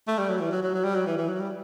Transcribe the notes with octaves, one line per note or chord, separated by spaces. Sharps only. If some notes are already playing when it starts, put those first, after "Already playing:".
A3
G3
F#3
E3
F#3
F#3
F#3
G3
F#3
E3
E3
F#3
G3